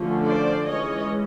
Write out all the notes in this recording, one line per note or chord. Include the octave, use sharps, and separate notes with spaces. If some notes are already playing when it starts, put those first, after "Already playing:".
Already playing: D3 F3 A3 C#4
C5 D5
E3 G#3 C#4 C#5 D#5